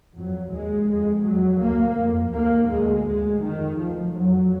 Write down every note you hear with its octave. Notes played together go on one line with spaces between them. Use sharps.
F2 F#3
D#2 G#3
F2 G#3
F2 F#3
D2 A#3
F2
D#2 A#3
D2 G#3
D2 G#3
F2 D#3
D2 F3
F2 F#3